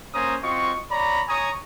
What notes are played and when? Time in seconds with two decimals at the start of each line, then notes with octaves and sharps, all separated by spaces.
0.14 A#3 C#4 C5 G#5 A#5 D#6
0.43 C4 F4 F#4 D#5 C#6
0.91 C#5 D5 A#5 B5
1.28 C#5 G#5 A#5 C#6 D#6